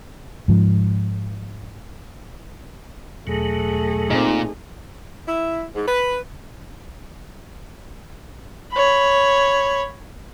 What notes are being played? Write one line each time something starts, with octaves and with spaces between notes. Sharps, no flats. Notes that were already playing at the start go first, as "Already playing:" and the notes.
G#2 F3
E2 B2 F#3 A3 G#4
A#2 C4 D#4
E4
G#2
B4
C#5 B5